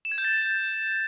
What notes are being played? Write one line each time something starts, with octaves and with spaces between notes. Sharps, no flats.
E7
G#6
G6
A6